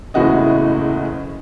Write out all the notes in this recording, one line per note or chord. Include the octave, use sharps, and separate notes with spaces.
F#1 E2 A2 C#3 F#4 D#5